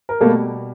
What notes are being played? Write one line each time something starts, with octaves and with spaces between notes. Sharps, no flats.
A#4
B2 G3 A3 A#3 A4